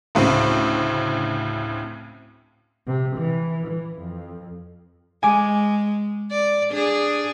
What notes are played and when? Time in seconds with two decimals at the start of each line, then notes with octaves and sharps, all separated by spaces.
0.15 D2 A2 C#3 C4
2.87 C3
3.16 E3
3.66 E3
3.99 F2
5.23 G#3 G#5 D6
6.31 D5
6.71 D4 G#4